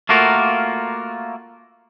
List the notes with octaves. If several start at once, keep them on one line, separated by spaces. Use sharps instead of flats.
A3 A#3 F4 F#4 A#4